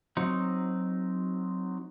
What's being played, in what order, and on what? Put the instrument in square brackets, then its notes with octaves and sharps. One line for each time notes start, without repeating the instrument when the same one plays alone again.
[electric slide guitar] F#3 C4 D#4